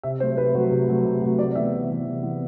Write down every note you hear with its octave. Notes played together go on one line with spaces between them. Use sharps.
C3 E5
F#3 A3 C5
C3 B4
F#3 A3
C3
F#3 A3
C3
F#3 A3
C3 D5
E3 B3 E5
C3
E3 B3
C3
E3 B3